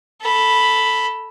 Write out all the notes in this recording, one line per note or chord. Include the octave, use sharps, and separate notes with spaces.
A4 B5